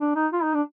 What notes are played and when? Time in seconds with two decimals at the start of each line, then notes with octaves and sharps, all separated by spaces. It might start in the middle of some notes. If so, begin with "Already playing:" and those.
0.01 D4
0.16 D#4
0.33 F4
0.43 D#4
0.54 D4